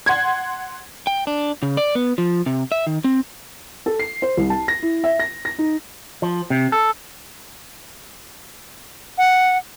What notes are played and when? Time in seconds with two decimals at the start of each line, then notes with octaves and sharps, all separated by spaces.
0.06 F#5 C6 G#6
1.07 G5
1.27 D4
1.62 C#3
1.77 D5
1.95 B3
2.18 F3
2.46 C3
2.72 E5
2.87 D#3
3.04 C4
3.86 A4
3.99 C7
4.22 C5
4.37 C2
4.50 A5
4.68 A#6
4.83 E4
5.04 E5
5.20 A#6
5.45 A#6
5.59 D#4
6.22 F3
6.50 C3
6.72 A4
9.18 F#5